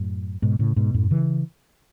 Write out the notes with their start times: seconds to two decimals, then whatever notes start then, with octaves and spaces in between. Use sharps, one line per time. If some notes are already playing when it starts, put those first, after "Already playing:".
Already playing: F#2 A2
0.42 G#2 B2
0.59 A2 C#3
0.76 G#2 B2
0.94 F#2 A2
1.11 C#3 E3